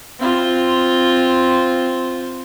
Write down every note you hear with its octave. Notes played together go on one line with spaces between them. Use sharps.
C4 F4